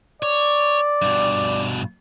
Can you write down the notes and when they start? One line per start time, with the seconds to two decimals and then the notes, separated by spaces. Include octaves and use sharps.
0.23 C#5 D5
1.02 G2 B2